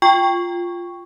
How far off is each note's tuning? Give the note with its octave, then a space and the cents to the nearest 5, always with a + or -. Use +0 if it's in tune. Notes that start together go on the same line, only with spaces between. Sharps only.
F4 +0 G5 +5 C#6 +0